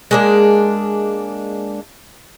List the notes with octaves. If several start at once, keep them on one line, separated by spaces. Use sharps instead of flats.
G#3 A#3 D4